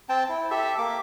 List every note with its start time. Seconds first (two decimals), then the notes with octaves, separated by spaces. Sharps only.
0.09 C4 G5 A5
0.29 E4
0.51 G4 A4 E5
0.78 A#3 D6